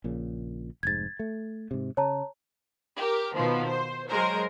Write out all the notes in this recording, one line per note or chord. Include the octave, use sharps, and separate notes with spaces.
A#1 A#2 C#3
F1 G#2 G#6 A6
A3
G#2 C3
C#3 C#5 A5 A#5
G4 A#4
B2 D#3 F3 B3
C5
F#3 G#3 A#4 C5